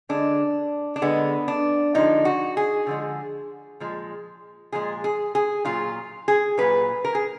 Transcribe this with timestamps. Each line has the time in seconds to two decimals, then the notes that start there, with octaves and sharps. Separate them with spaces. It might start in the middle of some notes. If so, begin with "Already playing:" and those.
0.09 D3 G#3 D4
0.96 D4
1.02 D3 G#3 B3
1.48 D4
1.94 D3 F3 G#3 D#4
2.25 F#4
2.57 G#4
2.87 D3 F3 G#3
3.80 A#2 F3 G#3
4.72 A#2 F3 G#3 G#4
5.04 G#4
5.35 G#4
5.65 A#2 F#3 F4
6.28 G#4
6.58 A#2 F#3 B4
7.05 A#4
7.15 G#4